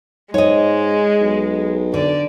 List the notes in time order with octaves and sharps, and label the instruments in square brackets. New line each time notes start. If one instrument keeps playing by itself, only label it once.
[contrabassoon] G#2 [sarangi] G#3 [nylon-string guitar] C#5 D#5
[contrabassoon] B1
[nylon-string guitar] D3 [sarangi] D5